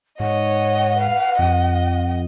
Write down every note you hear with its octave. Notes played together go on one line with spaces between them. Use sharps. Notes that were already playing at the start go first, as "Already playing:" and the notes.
G#2 C#5 D#5 F#5
B4 F5
F2 D#5